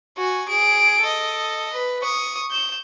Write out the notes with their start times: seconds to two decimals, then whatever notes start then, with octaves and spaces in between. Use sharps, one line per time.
0.18 F#4 G#5
0.49 G#4 D7
1.01 A4 D#5
1.74 B4
2.02 C#6 D#6
2.51 G6 E7